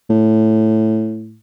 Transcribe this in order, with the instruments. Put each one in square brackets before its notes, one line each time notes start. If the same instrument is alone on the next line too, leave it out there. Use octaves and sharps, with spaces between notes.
[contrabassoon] A2